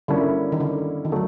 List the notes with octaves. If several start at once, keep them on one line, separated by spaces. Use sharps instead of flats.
D3 G3 A#3 C#4 E4
D#3
D3
D#3
D3 F#3 A3